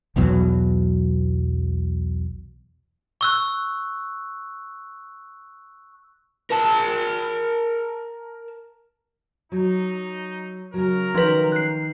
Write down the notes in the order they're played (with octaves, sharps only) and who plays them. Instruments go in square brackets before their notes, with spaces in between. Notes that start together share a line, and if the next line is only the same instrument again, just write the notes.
[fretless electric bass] B1 E2 B2 F#3
[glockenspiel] C#6 E6 F#6
[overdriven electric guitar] A#4 A5
[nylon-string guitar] F#3 [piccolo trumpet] D#4
[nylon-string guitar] C#3 F#3 [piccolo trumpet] A#4
[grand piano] D#3 [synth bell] F3 B4
[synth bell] F#6 C7